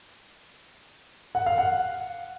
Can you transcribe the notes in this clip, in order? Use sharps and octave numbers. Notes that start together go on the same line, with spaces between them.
F#5
F5
F#5